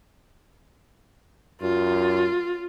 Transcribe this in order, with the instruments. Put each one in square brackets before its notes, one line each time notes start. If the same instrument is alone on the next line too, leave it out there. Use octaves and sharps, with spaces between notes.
[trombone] F#2 [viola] F4